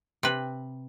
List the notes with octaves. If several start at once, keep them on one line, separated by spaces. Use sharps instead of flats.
C3 B4